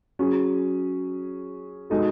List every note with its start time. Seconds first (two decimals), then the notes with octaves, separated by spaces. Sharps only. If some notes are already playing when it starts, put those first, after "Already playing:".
0.19 F#3 C#4 G#4
1.90 B2 G#3 D#4 A4